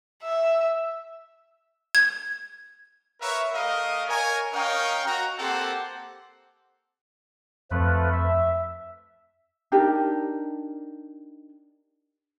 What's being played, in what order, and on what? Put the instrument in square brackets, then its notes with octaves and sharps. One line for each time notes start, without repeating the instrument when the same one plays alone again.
[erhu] E5
[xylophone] G#6
[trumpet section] A#4 B4 C#5 E5
A3 G4 A#4 D#5 F5
A#4 C#5 G#5
C#4 A#4 C#5 D#5 F5 G5
F#4 A#5
A#3 C4 G4 A4 C5 F#5
[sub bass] F2 [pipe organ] F3 A3 B4
[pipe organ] E5
[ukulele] D4 D#4 G4 A#4